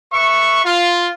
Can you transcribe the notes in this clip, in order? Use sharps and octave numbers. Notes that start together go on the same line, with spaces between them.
B4 E5 C#6
F4